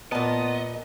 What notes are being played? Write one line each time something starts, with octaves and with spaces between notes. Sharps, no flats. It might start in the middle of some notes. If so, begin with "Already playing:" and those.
A#2 B3 D#5 A5